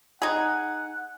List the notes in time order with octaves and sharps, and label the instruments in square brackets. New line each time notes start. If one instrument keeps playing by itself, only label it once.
[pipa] D#4 G#4 [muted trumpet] F#5